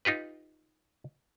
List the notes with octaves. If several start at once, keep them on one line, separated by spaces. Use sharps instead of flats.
D#4 F4 G4 B4